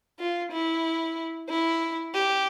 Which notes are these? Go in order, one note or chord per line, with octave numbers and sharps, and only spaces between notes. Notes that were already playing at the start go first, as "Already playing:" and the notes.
F4
E4
E4
G4